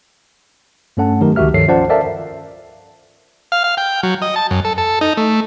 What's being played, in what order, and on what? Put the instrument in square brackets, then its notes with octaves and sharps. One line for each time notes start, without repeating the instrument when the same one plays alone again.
[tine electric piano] G2 A3 C#4 A4 F#5 A5
D#3 F#3 A3 D#4 G4 A#4
C#2 D#3 F#4 G4 E5 F6
G2 D#3 F3 A4 C#5 C7
C#4 F4 C5 D5 F#5 A5
A4 A#4 D5 E5 F5 A5
[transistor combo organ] F5
F5
G5
F#3
D#5
A5
F#2
A4
A4
D#4
A3